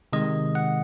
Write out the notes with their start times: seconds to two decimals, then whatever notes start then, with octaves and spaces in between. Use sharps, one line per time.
0.13 C3 D#3 G#3 D#5
0.55 F#5